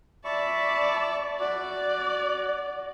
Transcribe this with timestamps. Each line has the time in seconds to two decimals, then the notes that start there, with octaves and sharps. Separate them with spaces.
0.25 D5 E5 A5 B5 C#6
1.40 F#4 D5